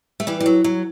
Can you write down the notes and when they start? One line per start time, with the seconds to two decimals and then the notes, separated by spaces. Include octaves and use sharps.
0.20 A3
0.27 E3 G3
0.40 G3
0.46 F#3
0.64 F#3